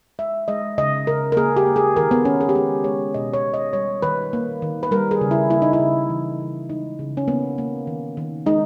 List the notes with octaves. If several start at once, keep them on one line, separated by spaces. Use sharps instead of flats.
G#3 E5
G#3 D#5
C#3 D#5
C#3 A#4
A#4
A#3 G#4
G4
A#3
G#4
D#3 A#4
B3
D#3 C#4
G#4
G4
G#3 G#4
G#3 C#5
B2 D#5
C#5
B2
D#5
G3 C#5
D#3 B4
A#3
D#3
B4
G3 A#4
G#4
C#3
E4
A#3 E4
D#4
E4
C#3
E3
C#3
G#3 D#4
C#3
C#4
A#3 B3
A#3
D#3
D#3
G#3 D#4